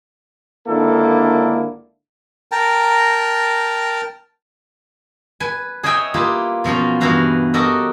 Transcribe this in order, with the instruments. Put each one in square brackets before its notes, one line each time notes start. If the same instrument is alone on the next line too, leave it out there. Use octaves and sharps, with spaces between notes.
[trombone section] G#1 D3 A#3 D4 E4 A4
[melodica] A#4 G5 A5 A#5
[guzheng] B4 G#5
G#4 C#5 D#5 E5 G5 G#5
A#3 E4 F4 G4 B4
B2 F3 F#3 C#4 F4
G2 B2 E3 F#4 F5 A#5
F#4 G4 A4 A#4 D#5 E5